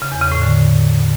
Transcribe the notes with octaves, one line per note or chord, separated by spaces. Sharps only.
C#3
E2
C#3
A2
D3